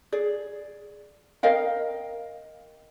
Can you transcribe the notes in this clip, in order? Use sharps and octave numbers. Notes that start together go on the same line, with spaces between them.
G#4 D5
A#4 D#5 F5 G5